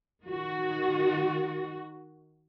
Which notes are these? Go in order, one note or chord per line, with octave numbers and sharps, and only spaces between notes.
D#3 F#4